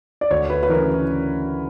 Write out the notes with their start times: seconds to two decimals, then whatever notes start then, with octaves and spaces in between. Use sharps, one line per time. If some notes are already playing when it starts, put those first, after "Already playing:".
0.21 D5
0.31 D2 C#5
0.50 B4
0.63 B4
0.69 C#3 E3 A#4